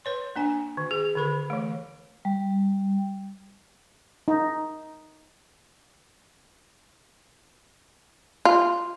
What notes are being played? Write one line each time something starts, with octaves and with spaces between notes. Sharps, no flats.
B4 C#5 C6
A#3 D4 G#5
D#3
G#4
D3 D#3 A4 B5
E3 A3
G3
D#4
F4